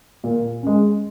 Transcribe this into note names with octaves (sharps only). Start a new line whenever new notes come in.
A#2
G#3 C#4